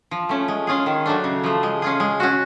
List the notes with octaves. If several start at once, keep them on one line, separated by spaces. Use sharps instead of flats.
F3
A3 C#4
G#3
C#4 F4 G#4
D#3
F#3 A3 D4
C#3
F3 A3
G#3
C#4 F4 G#4
G#3
C#4 F#4